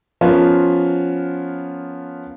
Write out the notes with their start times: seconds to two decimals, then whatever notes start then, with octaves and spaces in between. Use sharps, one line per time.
0.21 F3 B3 C#4 F4 A#4